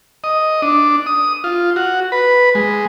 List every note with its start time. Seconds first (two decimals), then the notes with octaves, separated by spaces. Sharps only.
0.24 D#5
0.62 D4
1.06 D#6
1.44 F4
1.76 F#4
2.12 B4
2.55 G#3